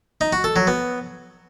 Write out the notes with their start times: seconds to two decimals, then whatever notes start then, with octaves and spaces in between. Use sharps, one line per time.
0.21 D#4
0.33 F#4
0.44 A4
0.56 F#3
0.67 B3